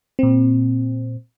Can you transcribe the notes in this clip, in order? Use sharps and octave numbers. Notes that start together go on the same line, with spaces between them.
A#2 C4